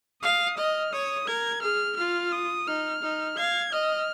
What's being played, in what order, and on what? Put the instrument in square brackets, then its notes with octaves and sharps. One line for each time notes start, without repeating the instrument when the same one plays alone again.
[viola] F5 [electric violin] D#6
[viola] D#5 [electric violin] F6
[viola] C#5 [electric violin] D#6
[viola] A#4 [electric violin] G#6
[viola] G#4 [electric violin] F6
[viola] F4 [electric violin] F6
[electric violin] D#6
[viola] D#4 [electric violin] F6
[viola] D#4
[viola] F5 [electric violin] G#6
[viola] D#5 [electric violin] F6